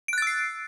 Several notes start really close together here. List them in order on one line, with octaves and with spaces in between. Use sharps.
D7 F#6 A6 E6 C7